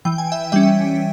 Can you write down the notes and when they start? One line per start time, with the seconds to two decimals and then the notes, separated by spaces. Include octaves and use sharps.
0.05 E3 G5
0.18 G#5
0.32 E5 G5
0.52 G3 C#4 E5 G5